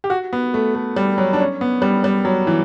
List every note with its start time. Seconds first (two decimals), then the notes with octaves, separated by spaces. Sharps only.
0.04 G4
0.10 F#4
0.33 B3
0.54 A3
0.75 A3
0.96 G3
1.18 F#3
1.33 D4
1.40 C#4
1.61 B3
1.82 G3
2.04 G3
2.25 F#3
2.47 E3